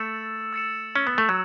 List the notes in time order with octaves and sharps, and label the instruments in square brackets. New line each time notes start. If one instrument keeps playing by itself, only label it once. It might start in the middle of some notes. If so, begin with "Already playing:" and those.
Already playing: [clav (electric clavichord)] A3 [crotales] E6 A6 C#7 E7
[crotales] E6 A6 C#7 E7
[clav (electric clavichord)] C#4
B3
A3
[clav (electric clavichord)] F#3 [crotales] E6